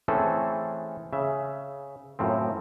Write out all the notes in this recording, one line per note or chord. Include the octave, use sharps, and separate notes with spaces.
E3 A3 C4 C#4 G#4 A4
C#3 E5
F#2 A2 F3 C4